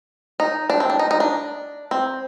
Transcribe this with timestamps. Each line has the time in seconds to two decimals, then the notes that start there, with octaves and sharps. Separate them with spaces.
0.40 D#4
0.70 D4
0.80 C4
0.90 D4
0.99 D#4
1.11 D#4
1.20 D4
1.91 C4